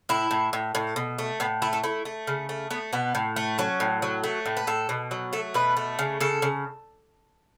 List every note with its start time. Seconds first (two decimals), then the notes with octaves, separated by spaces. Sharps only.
0.09 A2 E4
0.31 A2
0.53 A2
0.75 A2
0.96 B2
1.18 A3
1.40 A2 B3
1.62 A3 E4
1.73 A4
1.84 A3 E4
2.05 A3
2.27 C#3
2.49 A3
2.71 A3 B3
2.93 B2 B3
3.15 A2
3.36 A3
3.59 F#3 C#4
3.80 A2
4.02 F#3
4.24 A3
4.46 A2
4.57 B4
4.67 A2 A4
4.89 B2
5.11 F#3
5.33 A3 A4
5.54 B2 B4
5.77 A3
5.99 C#3
6.20 C#3 A4
6.42 C#3